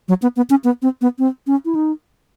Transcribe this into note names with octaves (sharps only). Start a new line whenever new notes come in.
F#3
B3
B3
C#4
B3
C4
B3
C4
C#4
E4
D#4